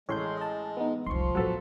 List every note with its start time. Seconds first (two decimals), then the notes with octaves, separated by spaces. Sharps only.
0.09 A1 G#3 C#5 C6 G6
0.37 D#5 A5
0.77 B3 D#4
1.07 F1 C2 F3 C6 C#6
1.35 A1 E2 F#3 A4 B4